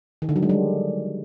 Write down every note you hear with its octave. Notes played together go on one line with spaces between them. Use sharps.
D#3
D3
F#3
G#3
G3